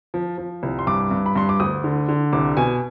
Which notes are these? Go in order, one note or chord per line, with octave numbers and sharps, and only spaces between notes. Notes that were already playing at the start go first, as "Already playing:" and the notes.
F3
F3
C2
C6
G2 D6
G2
B5
G2 C6
D6
D2 D#6
D3
D3
C2 D6
B2 G#5